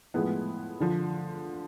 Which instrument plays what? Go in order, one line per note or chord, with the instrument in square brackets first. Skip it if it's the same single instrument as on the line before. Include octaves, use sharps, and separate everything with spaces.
[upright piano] A2 F3 G#3 B3 E4
D3 F3